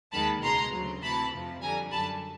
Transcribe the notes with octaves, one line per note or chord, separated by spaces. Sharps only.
D#2 D#3 G#3 A5 B5
C#2 B2 G#3 A#5 C6
D2 C#3 F#3
D2 C3 E3 A5 B5
F2 C3 F3
F2 D3 G3 G#5 A#5
F#2 D3 G3 A5 B5